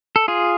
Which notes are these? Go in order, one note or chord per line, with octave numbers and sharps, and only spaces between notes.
A4
F4 G#4